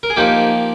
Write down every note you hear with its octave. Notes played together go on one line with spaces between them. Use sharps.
A#4
G#4
F3 A#3 D#4 G4